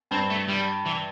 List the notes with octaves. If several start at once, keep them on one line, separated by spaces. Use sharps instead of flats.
G2 C4
A3
G3
E3